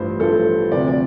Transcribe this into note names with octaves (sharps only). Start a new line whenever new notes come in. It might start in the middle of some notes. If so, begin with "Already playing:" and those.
Already playing: A1 G2 F3 C5
A1 G2 F3 A4
D2 C3 F3 D5
D5